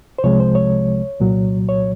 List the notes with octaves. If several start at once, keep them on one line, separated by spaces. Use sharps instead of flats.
C5
C2 C3 F3 G#3 C#5
C5
C#5
C2 A#2 F#3
C#5